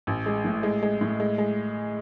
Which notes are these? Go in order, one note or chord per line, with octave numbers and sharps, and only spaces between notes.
A1
G#3
A2
G#3
G#3
A2
G#3
G#3